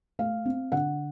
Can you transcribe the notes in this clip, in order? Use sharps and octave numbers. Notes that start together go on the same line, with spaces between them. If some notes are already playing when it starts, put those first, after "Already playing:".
A3 F5
C4
D3 F#5